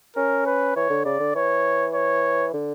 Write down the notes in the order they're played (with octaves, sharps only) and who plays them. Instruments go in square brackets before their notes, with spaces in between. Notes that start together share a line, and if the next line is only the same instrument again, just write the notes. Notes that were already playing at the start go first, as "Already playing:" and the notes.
[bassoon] C#4 [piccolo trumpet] A#4
[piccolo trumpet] B4
[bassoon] E3 [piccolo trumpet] C#5
[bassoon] D3
[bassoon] C#3 [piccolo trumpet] D5
[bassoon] D3
[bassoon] E3 [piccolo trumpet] C#5
[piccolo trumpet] C#5
[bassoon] D3